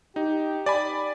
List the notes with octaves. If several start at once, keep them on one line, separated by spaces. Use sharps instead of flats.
D#4 G4
D5 G#5 B5